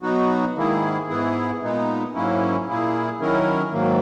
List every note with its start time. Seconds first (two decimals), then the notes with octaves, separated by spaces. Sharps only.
0.02 B2 F#3 B3 D#4 F#4
0.56 G#2 D#3 A#3 E4 G#4
1.09 G#2 E3 B3 E4 G#4
1.61 A#2 G#3 B3 D#4
2.14 G#2 F#3 A#3 C#4 E4
2.68 A#2 A#3 E4 G#4
3.21 D#3 F#3 C#4 E4 A#4
3.73 G#2 D#3 F#3 A#3